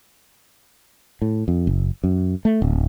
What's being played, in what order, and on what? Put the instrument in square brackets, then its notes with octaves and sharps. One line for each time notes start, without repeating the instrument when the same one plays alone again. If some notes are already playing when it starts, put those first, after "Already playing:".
[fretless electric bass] A2
F2
F#1
F#2
A3
D1